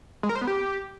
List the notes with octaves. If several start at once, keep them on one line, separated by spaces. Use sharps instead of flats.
G#3
A#4
C5
B3
G4